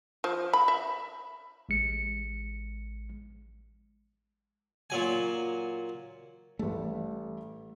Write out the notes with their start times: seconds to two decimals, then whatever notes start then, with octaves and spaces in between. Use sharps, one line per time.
0.24 F3
0.53 B5
0.68 E5
1.69 A1 G#3 C#7
4.90 A#2 F#3 G#5
6.59 A1 G3 A3 A4